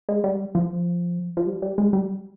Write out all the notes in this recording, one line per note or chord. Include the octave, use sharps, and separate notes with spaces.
G#3
G3
F3
F3
G3
G3
G#3
G3